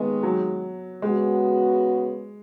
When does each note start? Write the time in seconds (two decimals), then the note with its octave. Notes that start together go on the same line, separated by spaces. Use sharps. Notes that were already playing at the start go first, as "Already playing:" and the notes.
Already playing: D#2 D#3 G#3 B3
0.23 F#3
1.02 C#3 G#3 B3 F#4